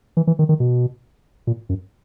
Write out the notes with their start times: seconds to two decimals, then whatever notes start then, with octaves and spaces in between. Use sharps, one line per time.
0.17 E3
0.27 E3
0.39 D#3
0.49 D#3
0.60 B2
1.47 A#2
1.69 F#2